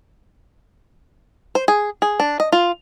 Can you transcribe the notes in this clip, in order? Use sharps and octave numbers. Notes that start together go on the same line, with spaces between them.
C5
G#4
G#4
D4
D#5
F4